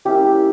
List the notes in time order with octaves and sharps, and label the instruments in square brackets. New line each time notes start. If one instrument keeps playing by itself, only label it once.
[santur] G3 A#3 C#4 E4 G4